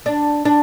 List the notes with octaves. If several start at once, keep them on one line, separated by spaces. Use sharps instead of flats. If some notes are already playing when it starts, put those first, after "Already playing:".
D4
D4